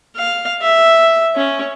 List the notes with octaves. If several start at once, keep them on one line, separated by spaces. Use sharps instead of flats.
F5
E5
C#4